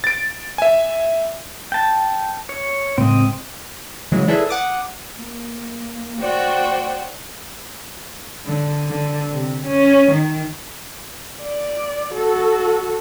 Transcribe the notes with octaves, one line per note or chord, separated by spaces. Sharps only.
A6 D7
E5 G#5
G5 A5
C#5
A2 C#3 G#3 C4 D#5
C#3 E3 F#3 G#3
D4 E4 G#4 A4 B4 E5
F#5 D6 D#6
A#3
F#4 C5 D5 G5
D3
D3
C3
C#4
D#3
D5
F#4 A4